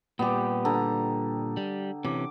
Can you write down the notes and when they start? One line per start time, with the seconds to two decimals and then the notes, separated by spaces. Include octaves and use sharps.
0.19 A#2 G3 B3 G4
0.65 D3 A#5
1.57 G3
2.05 C3 E3 C#4 D6